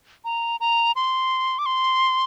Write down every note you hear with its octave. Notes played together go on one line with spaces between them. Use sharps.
A#5
A#5
C6
D6
C6